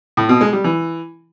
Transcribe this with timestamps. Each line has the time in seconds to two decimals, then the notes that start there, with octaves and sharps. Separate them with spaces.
0.17 A2
0.29 B2
0.41 G#3
0.53 G3
0.64 E3